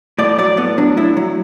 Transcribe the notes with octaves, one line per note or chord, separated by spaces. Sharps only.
A2 D5
F#3 D5
A2 B3
F#3 D4
A2 E4
F#3